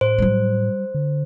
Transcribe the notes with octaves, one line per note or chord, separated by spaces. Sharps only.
A2 C5
F#3 G3
D3